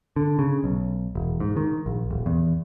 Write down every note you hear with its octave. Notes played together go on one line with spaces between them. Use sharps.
D3
C#3
B1
E1
G#2
D#3
A#1
D#1
E2